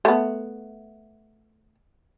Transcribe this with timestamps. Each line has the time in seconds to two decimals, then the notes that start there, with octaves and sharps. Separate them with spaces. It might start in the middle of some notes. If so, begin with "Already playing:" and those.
0.05 A3 B3